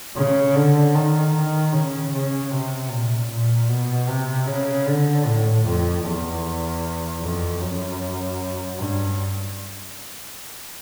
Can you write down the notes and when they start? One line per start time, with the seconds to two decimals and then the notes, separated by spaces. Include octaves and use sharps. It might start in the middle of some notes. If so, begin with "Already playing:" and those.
0.16 C#3
0.55 D3
0.94 D#3
1.34 D#3
1.73 C#3
2.13 C#3
2.51 C3
2.91 A#2
3.30 A#2
3.69 B2
4.09 C3
4.47 C#3
4.86 D3
5.26 A2
5.65 F2
6.05 E2
7.21 F2
7.61 F#2
8.78 G2